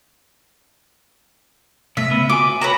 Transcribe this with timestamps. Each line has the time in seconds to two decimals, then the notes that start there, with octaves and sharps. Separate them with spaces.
1.97 C3 A3 E5
2.11 C#3 B3
2.29 F4 F#4 G#5 D6
2.61 F#4 B4 C#5 A#5